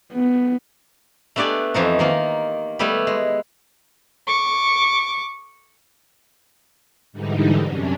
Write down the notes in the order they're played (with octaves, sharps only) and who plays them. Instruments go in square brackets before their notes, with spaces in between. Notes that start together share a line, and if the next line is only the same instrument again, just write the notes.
[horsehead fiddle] B3
[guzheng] A3 B3 D4 G4 D5 G#5
F2 E3 F3 D#4
D#3 A#3 F4
G3 A3 B3 E4 G4
G#3
[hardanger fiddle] C#6 D6
[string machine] G#2 D3 E3 G3 D#4
F#2 C3 C#4 D4